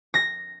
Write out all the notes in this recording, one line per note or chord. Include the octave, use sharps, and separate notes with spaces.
A#6